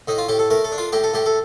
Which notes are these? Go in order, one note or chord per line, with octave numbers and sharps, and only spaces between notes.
A2 D#4
F4
A2 G4
A4
A3 A#4
A4
D4
F4
A2 G4
A4
A2 G4
A4